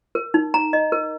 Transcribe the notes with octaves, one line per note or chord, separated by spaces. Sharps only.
A#4
D#4
A#5
D#5
A#4